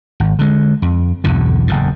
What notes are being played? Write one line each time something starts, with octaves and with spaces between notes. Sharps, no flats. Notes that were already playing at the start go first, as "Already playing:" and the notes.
G#1
D3 G#3
F2
B1 E2 G2 D3
F#1 E2 A2